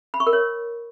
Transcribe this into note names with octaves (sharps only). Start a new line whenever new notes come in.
B5
C#6
A#4
C#5